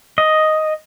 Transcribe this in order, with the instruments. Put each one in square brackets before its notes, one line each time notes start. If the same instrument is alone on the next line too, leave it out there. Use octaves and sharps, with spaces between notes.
[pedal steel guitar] D#5